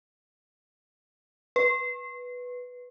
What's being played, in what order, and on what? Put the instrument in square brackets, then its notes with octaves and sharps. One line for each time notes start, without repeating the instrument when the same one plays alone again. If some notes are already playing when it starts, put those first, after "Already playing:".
[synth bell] B4